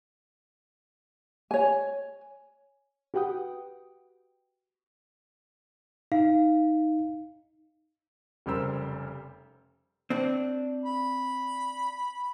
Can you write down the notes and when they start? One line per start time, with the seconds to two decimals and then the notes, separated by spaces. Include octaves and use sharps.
1.51 C#5 G#5
3.14 F#4 G4 B4 F#5 G5 D#6
6.12 D#4 F5
8.46 F1 C#3 G3 A#4 C5 E6
10.10 C4 D4
10.85 B5